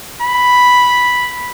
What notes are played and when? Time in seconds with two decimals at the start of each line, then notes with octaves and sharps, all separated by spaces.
0.22 B5